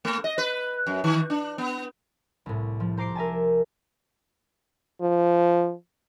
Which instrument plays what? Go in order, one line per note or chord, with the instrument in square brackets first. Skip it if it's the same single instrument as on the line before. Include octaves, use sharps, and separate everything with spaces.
[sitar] A3
D#5
B4
F#2
D#3
D4
B3
[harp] C2 A2
F3
C5 A#5 D6 C7 D7
A#4 E5 G#5 A5
[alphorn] F3